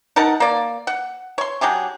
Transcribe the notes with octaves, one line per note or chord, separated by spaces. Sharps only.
D#4 A#4 F#5 A5
A#3 D5
F#5
C#5 C6
F#3 D4 G4 G#4